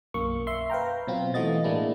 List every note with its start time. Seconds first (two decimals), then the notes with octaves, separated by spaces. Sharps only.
0.14 B1 F#2 A#3 C#6
0.47 E5 C6
0.70 B4 F5 G5 A#5
1.07 B2 F#3 C4 F4
1.34 E3 A3 F#4 D#5 A6
1.64 A2 G#3 A#3 D4 E4